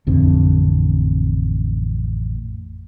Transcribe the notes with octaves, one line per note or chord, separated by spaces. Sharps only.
A1 F2 D3 C4